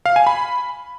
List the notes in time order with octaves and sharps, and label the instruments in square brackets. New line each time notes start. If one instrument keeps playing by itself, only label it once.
[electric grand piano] F5
G#5
B5